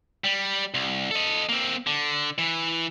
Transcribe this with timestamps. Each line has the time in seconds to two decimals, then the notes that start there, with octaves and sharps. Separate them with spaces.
0.24 G3
0.74 C2
1.11 A4 D#5
1.49 A#3 C4
1.87 D3
2.38 E3